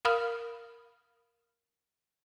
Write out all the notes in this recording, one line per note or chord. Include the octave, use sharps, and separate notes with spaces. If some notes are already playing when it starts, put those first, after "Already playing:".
A#4 F5 B5 D#6 F6